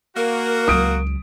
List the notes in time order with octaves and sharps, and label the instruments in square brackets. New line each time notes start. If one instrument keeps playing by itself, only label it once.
[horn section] A#3 F#4 [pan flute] A#4
[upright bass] C#2 F#3 [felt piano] D#6 D7